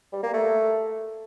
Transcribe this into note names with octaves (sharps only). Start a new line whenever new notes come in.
G3
A#3
A3